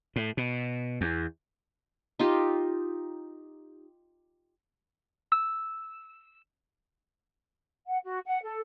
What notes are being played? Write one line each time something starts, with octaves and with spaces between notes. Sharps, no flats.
A2
B2
E2
D#4 F4 G4
E6
F#5
F#4
F#5
A4